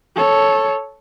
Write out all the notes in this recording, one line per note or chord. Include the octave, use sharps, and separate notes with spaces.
A4 C#5